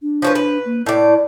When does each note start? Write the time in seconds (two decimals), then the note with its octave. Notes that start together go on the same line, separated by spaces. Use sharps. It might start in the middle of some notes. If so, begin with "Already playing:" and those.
0.02 D4
0.22 F3 C#4 B4
0.35 B4
0.65 A#3
0.86 A2 E4 D5